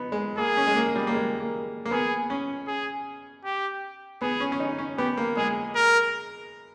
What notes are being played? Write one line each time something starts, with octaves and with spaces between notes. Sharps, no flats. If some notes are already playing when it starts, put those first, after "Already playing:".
Already playing: B3 D#4
G#3
A#3 G#4
C#4
G#3
A#3
G3
A#3
G#3
A#3
A#3
B3 G#4
C#4
G#4
G4
B3 G#4
C#4
C#4
D#4
C#4
B3 G4
A#3
G#3 G#4
A#4